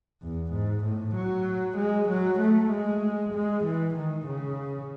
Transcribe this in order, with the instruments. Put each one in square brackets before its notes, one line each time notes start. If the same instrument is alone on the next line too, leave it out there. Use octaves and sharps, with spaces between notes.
[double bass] E2
G#2
A2
F#3
G#3
F#3
A3
G#3
G#3
E3
D#3
C#3